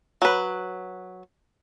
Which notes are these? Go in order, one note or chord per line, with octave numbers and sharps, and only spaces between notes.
F#3 B4